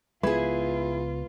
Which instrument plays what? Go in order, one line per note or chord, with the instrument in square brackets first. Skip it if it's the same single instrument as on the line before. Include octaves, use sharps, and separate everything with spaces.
[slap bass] C#2 G#3 B3 [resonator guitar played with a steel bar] E4 G#4 [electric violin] F4 [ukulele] B4